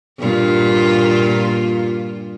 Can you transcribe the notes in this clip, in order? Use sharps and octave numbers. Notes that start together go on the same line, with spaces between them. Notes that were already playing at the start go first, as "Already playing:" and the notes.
G2 A#2 F4